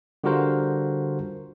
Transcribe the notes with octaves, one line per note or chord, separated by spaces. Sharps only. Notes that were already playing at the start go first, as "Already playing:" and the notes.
D3 G3 F4 F#4 A#4 C5